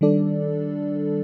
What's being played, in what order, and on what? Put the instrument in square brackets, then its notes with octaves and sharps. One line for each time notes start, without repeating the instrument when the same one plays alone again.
[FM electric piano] D#3 G3 D4 A4 D5